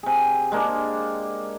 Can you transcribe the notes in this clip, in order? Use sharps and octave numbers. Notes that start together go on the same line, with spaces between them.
C3 G#4
G#3 A#3 D4